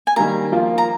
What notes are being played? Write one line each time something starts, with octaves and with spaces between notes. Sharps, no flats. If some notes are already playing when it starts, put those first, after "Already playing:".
G#5
D#3 G3 A#3 A#5
F3 A#3 F4
A#5